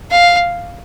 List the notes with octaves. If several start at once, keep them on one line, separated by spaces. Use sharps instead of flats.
F5